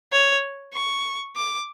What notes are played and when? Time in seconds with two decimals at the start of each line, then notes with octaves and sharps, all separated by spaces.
0.12 C#5
0.74 C#6
1.36 D6